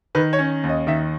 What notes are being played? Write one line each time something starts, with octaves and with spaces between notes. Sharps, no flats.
D#3 B4
C#5
C#4
D#2
D#5
D#3 E5